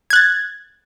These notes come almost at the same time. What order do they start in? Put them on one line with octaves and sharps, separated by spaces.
G#6 F#6 A6